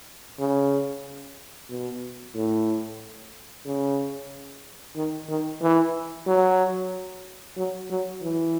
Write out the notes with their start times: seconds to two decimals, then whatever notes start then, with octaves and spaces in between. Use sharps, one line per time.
0.39 C#3
1.70 B2
2.35 A2
3.66 C#3
4.96 D#3
5.29 D#3
5.61 E3
6.26 F#3
7.57 F#3
7.90 F#3
8.22 E3